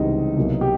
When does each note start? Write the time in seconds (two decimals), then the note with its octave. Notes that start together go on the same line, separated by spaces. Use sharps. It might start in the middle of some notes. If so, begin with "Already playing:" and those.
Already playing: C#2 C3 E3 G3 D#4
0.37 C2 B2 F#3 A#3
0.61 G4